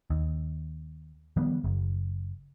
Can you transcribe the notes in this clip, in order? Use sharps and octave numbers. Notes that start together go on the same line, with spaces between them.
D#2
D#3 F3 G3 B3
F#1